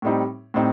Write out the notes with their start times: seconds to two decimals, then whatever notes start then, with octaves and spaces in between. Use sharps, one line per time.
0.02 A2 G3 C4 D#4
0.54 A2 G3 C4 D#4